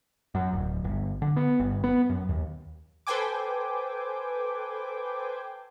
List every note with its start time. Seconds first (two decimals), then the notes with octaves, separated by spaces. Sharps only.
0.35 F#2
0.53 D1
0.84 G1
1.22 D3
1.36 B3
1.60 G1
1.84 B3
2.09 F#2
2.29 D#2
3.07 A4 B4 C5 G5 G#5 D6